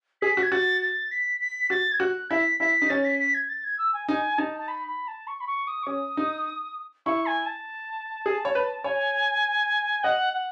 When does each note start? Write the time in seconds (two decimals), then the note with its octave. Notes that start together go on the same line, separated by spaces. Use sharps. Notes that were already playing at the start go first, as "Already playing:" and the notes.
0.21 G#4 B6
0.37 F#4
0.43 G#6
0.51 F#4 A6
0.81 A6
1.11 B6
1.40 B6
1.70 F#4 A6
1.92 G#6
2.00 F#4 F#6
2.30 E4 B6
2.60 E4 B6
2.82 D#4
2.89 C#4 A6
3.05 B6
3.19 B6
3.34 G#6
3.49 A6
3.64 G#6
3.78 E6
3.94 G#5
4.08 D#4 G#5
4.38 D#4 A5
4.59 A5
4.68 B5
4.88 B5
5.08 A5
5.27 C#6
5.40 B5
5.47 C#6
5.67 D#6
5.83 C#6
5.87 C#4 D#6
6.17 D#4
7.06 E4 C#6
7.26 G#5
7.46 A5
8.26 G#4
8.45 C#5
8.55 B4
8.84 C#5 G#5
10.03 D#5 F#5
10.33 F#5